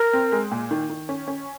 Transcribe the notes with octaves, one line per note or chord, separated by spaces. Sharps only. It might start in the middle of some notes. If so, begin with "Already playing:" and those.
Already playing: A#4
C4
G#3
A#2
D#3
D#3
C#4
C#4